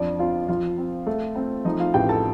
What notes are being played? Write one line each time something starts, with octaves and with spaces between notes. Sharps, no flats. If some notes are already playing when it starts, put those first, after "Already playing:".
Already playing: F2 F3 D4 D5
C4 F4 F5
F3 F4 F5
C4
A3
C4
F3 D#4 D#5
F4 F5
A1 G4 G5
A4 A5